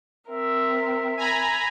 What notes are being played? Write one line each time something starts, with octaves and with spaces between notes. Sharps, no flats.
C4 A#4 E5
G#5 A#5 B5